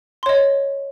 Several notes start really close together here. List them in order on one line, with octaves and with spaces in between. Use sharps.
C6 C#5 D#5